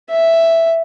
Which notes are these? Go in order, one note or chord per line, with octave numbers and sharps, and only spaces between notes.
E5